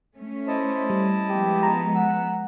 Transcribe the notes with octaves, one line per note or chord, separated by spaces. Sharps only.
A3 C#4
E4 C5 D#5 A5
G3
F3 G#3 B3 G4
A#5
F#5 E6